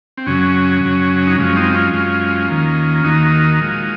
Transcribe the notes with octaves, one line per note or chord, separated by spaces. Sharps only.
C4
F#2 C#3 F#3 C#4
F#2 C#3 F#3
D#4
F#2 F3 G#3 C#4
C4 D#4
C#4 F4
F#2 F3 G#3
D#2 D#3 A#3
D#2 D#3 A#3 D#4 F#4
A#2 F3 G#3